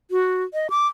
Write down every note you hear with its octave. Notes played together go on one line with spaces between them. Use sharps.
F#4
D#5
D6